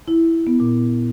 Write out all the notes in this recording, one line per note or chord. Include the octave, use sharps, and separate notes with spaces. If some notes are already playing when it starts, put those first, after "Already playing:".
E4
B3
A#2